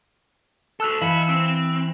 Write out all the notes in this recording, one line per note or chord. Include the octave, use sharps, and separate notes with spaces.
F#4 A4 A5 E6 F#6
E3 D#5 F5 B5 B6 C#7
C4 E6